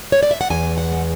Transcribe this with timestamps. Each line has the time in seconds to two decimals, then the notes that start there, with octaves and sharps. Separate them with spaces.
0.12 C#5
0.23 D5
0.31 E5
0.41 F#5
0.50 E2 G#5
0.78 F#5
0.92 G#3